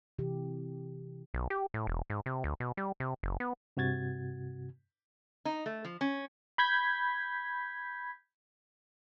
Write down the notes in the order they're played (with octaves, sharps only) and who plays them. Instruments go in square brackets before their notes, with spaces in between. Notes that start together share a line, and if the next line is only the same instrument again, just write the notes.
[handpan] C3 E3 G4
[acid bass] B1
G4
A2
E1
G#2
C3
D2
B2
G3
C3
F#1
B3
[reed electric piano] G2 C3 F#4 G#6 A6
[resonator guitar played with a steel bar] D#4
A3
F3
C#4
[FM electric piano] B5 G6 G#6 B6